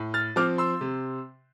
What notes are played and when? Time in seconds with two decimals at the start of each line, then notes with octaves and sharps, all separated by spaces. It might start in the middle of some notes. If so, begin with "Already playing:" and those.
Already playing: A2
0.14 F6 A6
0.36 F3 C4 D6 F6
0.58 C6 E6
0.81 C3